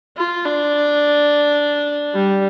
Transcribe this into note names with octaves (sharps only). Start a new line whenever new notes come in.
F4
D4
G3